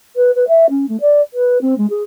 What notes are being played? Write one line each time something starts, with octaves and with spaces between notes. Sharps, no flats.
B4
B4
E5
C#4
A3
D5
B4
C4
G#3
G#4